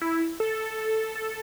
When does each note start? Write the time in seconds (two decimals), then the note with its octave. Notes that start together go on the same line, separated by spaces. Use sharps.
0.01 E4
0.40 A4
1.15 A4